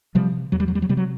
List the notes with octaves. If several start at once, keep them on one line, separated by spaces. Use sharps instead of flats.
C3 F3 G3
E2 F#3
G3
F#3
G3
F#3
C3 G3
F#3